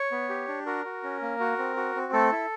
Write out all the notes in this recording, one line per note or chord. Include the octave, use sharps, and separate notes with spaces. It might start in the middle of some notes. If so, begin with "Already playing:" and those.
Already playing: C#5
B3
G4
D4
F#4 A#4
F#4
C#4
A#3
F#4
C4
F#4
C4
A3 A4
E4